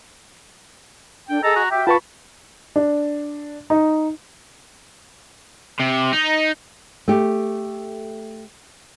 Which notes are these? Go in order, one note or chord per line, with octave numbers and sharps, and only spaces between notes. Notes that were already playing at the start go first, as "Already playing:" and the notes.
D4 A4 G5
G#4 A4 D#5 A#5
F#4
F#4 G4 E5 G5
F4 B4 A5 B5 C#6
D4
D#4
C3
D#4
A3 G4